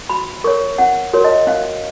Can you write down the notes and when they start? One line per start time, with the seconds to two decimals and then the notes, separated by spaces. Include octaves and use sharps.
0.09 F#4 B5
0.44 A#4 C#5 C#6
0.78 C#4 F#5
1.13 F#4 A#4 C#5
1.24 D#5
1.47 C#4 F5